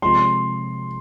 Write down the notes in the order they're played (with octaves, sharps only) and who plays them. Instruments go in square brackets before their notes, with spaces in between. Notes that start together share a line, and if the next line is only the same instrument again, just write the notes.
[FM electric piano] C3 F3 G#3 [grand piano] C6